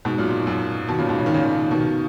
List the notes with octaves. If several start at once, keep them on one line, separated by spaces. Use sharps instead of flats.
G#2 B2
F#2 A#2
F#2
B2 D#3
A#2 C#3
G#2 B2
C#3
D#3
A#2 C#3
B2 D#3